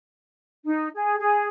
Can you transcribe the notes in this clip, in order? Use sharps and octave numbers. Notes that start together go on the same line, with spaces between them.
D#4
G#4
G#4